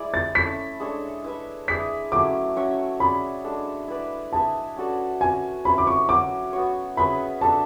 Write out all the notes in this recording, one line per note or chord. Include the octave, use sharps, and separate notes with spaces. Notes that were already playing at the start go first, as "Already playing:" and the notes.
Already playing: G#3 E4 G#4 D5
A6
A3 C#4 E4 B6
G#3 D4 A4 C#5
E4 B4 E5
E4 G#4 D5 B6
F#3 A3 C#4 E4 D6
C#4 F#4 C#5 E5
C#4 G#4 D5 B5
G#3 D4 A4
E4 B4 D5
E4 G#4 B4 E5 A5
C#4 F#4 A4 D5
C#4 F#4 B4 G#5
C#4 E4 B4 B5
D6
C#6
F#3 C#4 F#4 D6
B3 F#4 C#5
C#4 G#4 B4 E5 B5
D4 A4 E5 A5